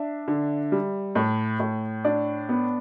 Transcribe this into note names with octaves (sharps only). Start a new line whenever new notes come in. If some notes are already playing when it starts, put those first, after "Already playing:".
Already playing: D4 E5
D3
G3
A2
A2
D4 D5
B3